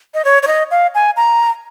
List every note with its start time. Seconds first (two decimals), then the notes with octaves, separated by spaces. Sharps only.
0.14 D#5
0.25 C#5
0.43 C#5
0.47 D#5
0.71 F5
0.95 G#5
1.17 A#5